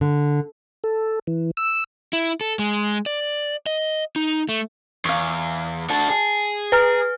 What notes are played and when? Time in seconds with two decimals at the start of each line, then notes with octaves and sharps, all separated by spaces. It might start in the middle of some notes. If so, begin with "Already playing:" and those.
0.01 D3
0.84 A4
1.27 E3
1.57 E6
2.13 E4
2.41 A4
2.59 G#3
3.06 D5
3.66 D#5
4.16 D#4
4.49 A3
5.05 E2 F5 C#6
5.90 D4 F#4 A5
6.10 G#4
6.72 B4 A#5 F6